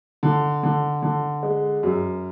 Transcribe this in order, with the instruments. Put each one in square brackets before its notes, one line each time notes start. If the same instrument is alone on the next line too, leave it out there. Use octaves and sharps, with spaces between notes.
[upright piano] D3
D3
D3
G#3
F#2